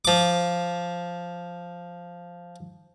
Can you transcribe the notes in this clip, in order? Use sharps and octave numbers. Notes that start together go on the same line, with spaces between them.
F3 D6